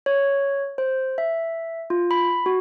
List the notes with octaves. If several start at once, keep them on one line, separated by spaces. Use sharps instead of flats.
C#5
C5
E5
F4
B5
F#4